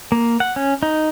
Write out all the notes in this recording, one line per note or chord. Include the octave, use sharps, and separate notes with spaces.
A#3
F#5
C#4
D#4